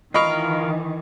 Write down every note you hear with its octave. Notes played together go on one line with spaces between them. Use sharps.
D#3 E3 F4 A#4 D#5 F5 B5 C#6